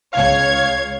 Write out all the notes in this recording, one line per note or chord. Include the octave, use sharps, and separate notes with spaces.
C#2 C#5 F5 G#6